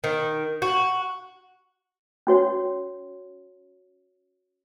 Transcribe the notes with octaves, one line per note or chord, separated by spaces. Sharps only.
D#3
F#4
C#4 F#4 C#5